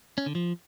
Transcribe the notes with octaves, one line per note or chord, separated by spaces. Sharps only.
C#4
D3
F3